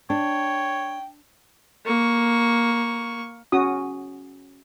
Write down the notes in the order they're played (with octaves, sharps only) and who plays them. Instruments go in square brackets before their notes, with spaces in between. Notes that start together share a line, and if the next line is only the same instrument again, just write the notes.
[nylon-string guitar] D4 [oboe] C#5 [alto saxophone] G5
[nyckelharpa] A#3 C#6
[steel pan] C#4 F#4 D#6